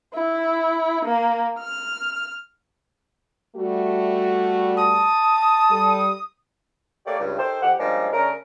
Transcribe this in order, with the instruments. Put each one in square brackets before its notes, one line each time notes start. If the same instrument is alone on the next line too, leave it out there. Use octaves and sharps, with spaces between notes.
[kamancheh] E4
A#3
F6
[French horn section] G3 A3 F#4
[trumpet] A5 [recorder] D#6
[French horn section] G3 A4
[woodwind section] A3 A#3 G4 C#5 D5
C#2 G2
D#3 G4 A4 C5
F2 G4 F#5
F3 G3 G#3 A#3 C#4 D4
C#3 A3 C#4 D4 A#4